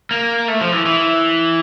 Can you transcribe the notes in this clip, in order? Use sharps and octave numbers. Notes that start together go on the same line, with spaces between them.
A#3
A3
F3
E3
E3